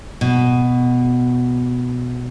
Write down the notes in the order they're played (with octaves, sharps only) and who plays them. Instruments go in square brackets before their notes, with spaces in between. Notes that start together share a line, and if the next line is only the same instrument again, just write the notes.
[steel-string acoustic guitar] B2